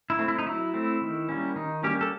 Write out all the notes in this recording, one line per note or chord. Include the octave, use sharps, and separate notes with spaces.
E4
A3 C4
E4
D#4
F#3 E4
A3 C4
D#3
G3 A#3 C#4
D#3 D#4
G3 A#3 C#4 G4
A4